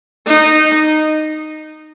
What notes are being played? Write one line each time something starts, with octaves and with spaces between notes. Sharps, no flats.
D#4